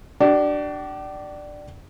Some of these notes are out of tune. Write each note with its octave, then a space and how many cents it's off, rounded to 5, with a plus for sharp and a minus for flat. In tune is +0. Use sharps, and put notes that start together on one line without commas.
D4 +10 G4 -45